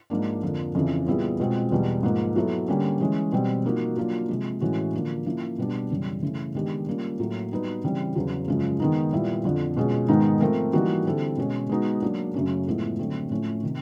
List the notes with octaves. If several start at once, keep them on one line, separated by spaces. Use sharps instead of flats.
G#2 F3 A#3 D4
F2 D3 F3 A#3
F2 C#3 E3
A#2 G3 B3 E4 G#4
B2 G#3 C4 F4
E2 B2 G3
G#2 F3 A#3
F#3 B3 E4 A4
D3 G3 A#3 C#4
E3 G#3 C#4
B2 G3 C4
F3 A#3 D#4 F#4
F#3 A#3 D4 F4
C3 F3 G#3
A2 E3 G#3 C#4 F#4
D3 F3 A#3
F3 A#3 C#4 E4
B2 G3 B3 D4
F#2 C#3 E3 G3
C#3 E3 A3
D#3 G#3 B3 D4 G4
G3 A#3 C#4 F4
A2 F#3 A#3
G3 B3 D#4 F#4 B4
C#3 E3 G3 C4
E2 C#3 F#3
F#2 C#3 F3 G#3
D#3 G#3 B3 D#4
A#2 G3 B3 E4
F2 D3 F3
B2 G#3 C#4 F4 G#4
G#2 D#3 G#3 B3 D#4
F3 A3 C4 F4 A#4
E3 G3 A#3 D#4 F#4
D3 G3 C4 E4 A4
B2 G#3 C#4
G#3 B3 D#4 F#4
F#3 A#3 D4
F#2 C#3 F#3 A3 C#4
A2 F3 G#3 B3 E4
D3 F#3 A3 C4
A2 F3 A3 C#4
C3 D#3